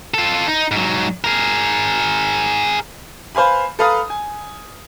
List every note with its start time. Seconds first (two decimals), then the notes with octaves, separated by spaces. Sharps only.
0.14 F4 A4
0.48 D#4
0.71 G#2 F#3
1.24 G#4 A#4
3.35 B4 C5 F5 G#5 B5
3.79 A4 B4 F5 A#5 D#6
4.10 G#5